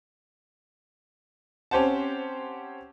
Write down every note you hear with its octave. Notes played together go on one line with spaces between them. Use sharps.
C4 C#4 G4 C5 F#5 A5